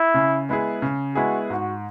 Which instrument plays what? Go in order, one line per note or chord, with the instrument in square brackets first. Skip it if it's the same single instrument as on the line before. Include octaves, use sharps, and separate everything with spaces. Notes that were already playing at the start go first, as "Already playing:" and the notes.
Already playing: [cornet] E4
[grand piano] C#3
G#3 B3 E4 G#4
C#3
[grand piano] G#3 B3 E4 G#4 [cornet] F#4
[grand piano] G#2 [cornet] F#4